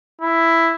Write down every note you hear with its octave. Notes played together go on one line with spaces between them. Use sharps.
E4